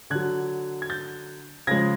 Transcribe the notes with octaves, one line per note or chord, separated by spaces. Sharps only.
D3 F#3 F#6 G#6
G#6
G6 A6
C#3 F3 G#3 G#6 A#6